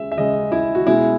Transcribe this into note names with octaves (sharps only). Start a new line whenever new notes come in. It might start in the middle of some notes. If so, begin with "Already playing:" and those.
Already playing: C#3 G#3 E5
E5
C#3 G#3 D#5
E4
F#4
B2 G#3 E4